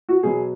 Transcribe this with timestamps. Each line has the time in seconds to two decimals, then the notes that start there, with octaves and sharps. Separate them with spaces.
0.09 F#4
0.23 B2 F#3 G#4